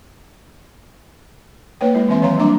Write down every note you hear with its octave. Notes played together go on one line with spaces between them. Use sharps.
A#3 B4 C#5 G5
G#3 E4
E3 C4 E5 C6
D#3 F#3 C#5 F5 A#5 C6
G3 A#3 D4 A#5 D6